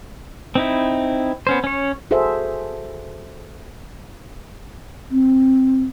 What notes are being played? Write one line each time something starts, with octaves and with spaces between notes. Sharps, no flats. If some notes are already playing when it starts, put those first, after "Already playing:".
C4 D#4 E4
B3 C#4 C5
C#4 C#5
F#4 G#4 A4 C5 E5
C4